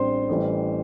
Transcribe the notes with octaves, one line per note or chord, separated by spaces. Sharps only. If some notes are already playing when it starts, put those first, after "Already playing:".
Already playing: A1 A2 G3 C4 D4 C5 C6
A1 A2 E3 G3